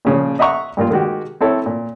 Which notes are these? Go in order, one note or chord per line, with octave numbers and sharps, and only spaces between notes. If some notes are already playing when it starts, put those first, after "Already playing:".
A#2 C#3 F3
D#5 E5 F#5 A#5 C#6
G2 A#2 A#3 F4
D#3 G#3 F#4 G4
C4 E4 A4 C#5
A#2